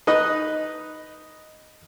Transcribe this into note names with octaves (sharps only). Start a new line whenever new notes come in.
D#4 B4 D#5 F#6